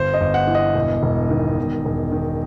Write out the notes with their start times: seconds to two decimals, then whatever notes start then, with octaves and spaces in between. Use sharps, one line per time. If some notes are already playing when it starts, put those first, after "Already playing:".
Already playing: G1 C5
0.14 D#5
0.21 G1
0.34 F#5
0.47 E3
0.55 D#5
0.75 E1
1.03 E1
1.30 D#3
1.58 E1
1.85 E1
2.12 D#3